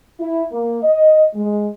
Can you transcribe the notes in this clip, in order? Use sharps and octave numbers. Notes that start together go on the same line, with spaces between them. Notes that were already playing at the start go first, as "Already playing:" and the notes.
E4
A#3
D#5
G#3